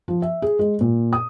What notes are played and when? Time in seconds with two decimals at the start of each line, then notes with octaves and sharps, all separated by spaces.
0.08 F3
0.22 E5
0.42 G#4
0.59 G#3
0.81 A#2
1.13 D#6